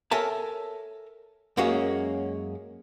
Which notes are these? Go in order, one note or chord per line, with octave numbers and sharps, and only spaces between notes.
A4 A#4 C#5 E5 G#5 A5
F#2 G#3 A#3 C#4 F#4